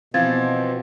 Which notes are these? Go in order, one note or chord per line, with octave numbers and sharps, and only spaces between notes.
B2 E3 F3 C4 F5 G#6 A6